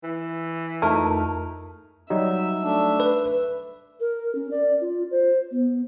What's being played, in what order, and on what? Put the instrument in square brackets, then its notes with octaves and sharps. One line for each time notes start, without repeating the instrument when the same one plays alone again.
[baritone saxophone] E3
[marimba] F2 [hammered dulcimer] A3 D#4 [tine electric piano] A#4
[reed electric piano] F#3 G3 D#4 [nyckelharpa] E5
[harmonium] A3 D4
[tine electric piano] B4
[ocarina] A#4
C#4
D5
F4
C5
B3